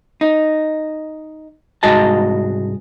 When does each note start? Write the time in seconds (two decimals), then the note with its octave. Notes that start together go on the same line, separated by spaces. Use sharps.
0.21 D#4
1.83 C2 G#2 G#3 F#4 D#5 A5